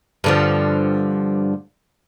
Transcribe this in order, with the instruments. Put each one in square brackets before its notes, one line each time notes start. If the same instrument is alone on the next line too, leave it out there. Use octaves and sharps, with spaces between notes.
[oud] G2 D3 F3